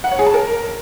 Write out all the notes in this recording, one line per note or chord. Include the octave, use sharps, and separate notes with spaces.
F#5
C#5
G#4
A5
A#4